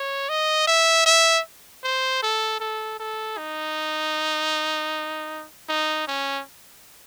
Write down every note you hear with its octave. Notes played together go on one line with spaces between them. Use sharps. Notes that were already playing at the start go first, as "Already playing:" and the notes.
Already playing: C#5
D#5
E5
E5
C5
A4
A4
A4
D#4
D#4
C#4